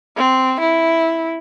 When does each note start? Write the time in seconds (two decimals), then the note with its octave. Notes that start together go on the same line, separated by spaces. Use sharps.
0.17 C4
0.60 E4